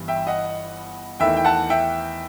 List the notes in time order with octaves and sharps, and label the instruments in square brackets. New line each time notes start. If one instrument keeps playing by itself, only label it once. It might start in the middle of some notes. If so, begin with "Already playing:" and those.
Already playing: [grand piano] G1 G2 E3
E5 G5
D#5 F#5
E2 D#3 A3 E4 E5 G5
G5
F#5 A5
E5 G5